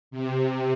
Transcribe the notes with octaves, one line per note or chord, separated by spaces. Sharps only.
C3